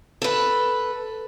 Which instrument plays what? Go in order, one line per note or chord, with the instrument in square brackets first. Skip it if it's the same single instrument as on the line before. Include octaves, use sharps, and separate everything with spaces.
[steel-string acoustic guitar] A4 B4